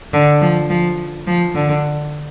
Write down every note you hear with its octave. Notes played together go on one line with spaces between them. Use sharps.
D3
F3
F3
F3
D3